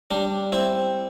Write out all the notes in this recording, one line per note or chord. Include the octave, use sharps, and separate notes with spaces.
G3 D4
C4 E4